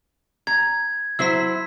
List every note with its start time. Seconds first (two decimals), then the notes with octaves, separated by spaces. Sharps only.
0.47 A#5 G#6
1.19 F#3 E4 C5 E6 B6